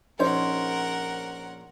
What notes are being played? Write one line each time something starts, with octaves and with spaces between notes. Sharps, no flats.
A#1 C#4 D#4 A#4 C5 C#5 F#5